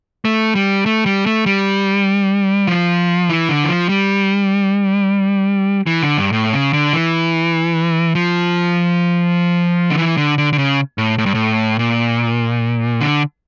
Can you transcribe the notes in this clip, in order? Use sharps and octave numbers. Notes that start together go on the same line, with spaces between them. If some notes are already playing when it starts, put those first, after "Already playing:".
A3
G3
A3
G3
A3
G3
F3
E3
D3
E3
F3
G3
E3
D3
G2
A2
C#3
D3
E3
F3
D3
E3
D3
D3
D3
C#3
A2
A2
G2
A2
A#2
D3